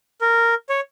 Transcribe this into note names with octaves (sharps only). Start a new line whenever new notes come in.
A#4
C#5